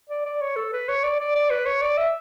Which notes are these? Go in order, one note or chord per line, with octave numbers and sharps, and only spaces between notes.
D5
D5
C#5
A4
B4
C#5
D5
D5
D5
B4
C#5
D5
E5